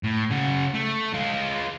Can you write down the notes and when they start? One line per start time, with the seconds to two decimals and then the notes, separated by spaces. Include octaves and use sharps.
0.03 A2
0.30 C#3 F#4
0.74 A3
1.14 G#3 F4